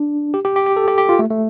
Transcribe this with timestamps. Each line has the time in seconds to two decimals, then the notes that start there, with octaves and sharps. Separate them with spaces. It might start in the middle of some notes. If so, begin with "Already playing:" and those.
Already playing: D4
0.34 G4
0.45 G4
0.56 G4
0.67 G4
0.77 A4
0.88 G4
0.98 G4
1.09 F4
1.19 A3
1.30 A3